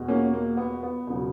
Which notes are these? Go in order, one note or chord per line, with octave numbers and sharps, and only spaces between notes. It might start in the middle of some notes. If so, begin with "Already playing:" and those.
Already playing: E2 B2 G#3
A#3 C#4
A#3
B3
B3
E1 C#3 F#3